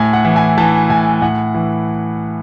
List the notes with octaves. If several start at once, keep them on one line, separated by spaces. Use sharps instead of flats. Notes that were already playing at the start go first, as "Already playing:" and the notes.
Already playing: A2 G#5
F#5
E3
G#5
E3 A5
A2 G#5
A2 F#5
E3